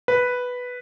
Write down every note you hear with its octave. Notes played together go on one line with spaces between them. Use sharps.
B4